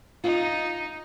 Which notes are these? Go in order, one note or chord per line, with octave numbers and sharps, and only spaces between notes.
D#4 F4